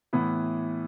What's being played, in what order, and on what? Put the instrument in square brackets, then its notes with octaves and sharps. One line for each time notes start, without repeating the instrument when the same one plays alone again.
[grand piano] A2 E3 B3 E4